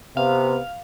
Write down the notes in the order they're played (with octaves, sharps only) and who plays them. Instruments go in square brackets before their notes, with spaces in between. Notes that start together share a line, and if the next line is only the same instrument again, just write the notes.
[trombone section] C3 B3 [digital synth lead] F5